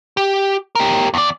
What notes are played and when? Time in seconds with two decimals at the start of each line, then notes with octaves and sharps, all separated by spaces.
0.17 G4
0.75 G4 A#4
1.14 E2 D5